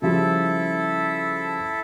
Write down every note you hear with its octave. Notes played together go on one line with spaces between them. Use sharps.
C#3 F3 G3 E4 A4